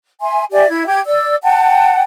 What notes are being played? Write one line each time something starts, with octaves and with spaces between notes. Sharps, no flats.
E5 G#5 C6
G4 D5 E5 G#5
E4 G#6
G4 G#6
D5 E6
F#5 G5 A5